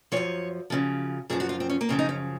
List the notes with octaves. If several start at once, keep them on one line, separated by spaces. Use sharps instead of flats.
F#2 C#3 F3 C#5
F#2 C#3 F3
F#2 C#3 F3 G#4
F#4
F4
C4
C#4
A#3
F#2 C#3 F3 C4
D#4
C#4